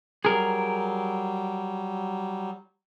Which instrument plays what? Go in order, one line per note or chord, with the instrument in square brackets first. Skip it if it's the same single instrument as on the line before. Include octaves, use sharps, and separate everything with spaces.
[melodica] F#3 G3 [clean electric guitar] G#4 A#4